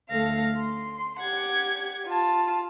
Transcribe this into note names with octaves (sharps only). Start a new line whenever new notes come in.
D2 A3 A4 F5 A#6
C6
G4 F#5 G#6
F4 A5